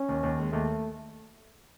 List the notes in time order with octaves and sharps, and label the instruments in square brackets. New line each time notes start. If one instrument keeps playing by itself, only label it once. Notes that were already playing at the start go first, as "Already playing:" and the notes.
Already playing: [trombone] C#4
[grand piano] D#2
D#2
G#3
[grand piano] D#2 [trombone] A3